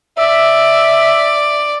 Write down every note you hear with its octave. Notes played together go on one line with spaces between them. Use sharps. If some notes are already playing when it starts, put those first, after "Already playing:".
D5 E5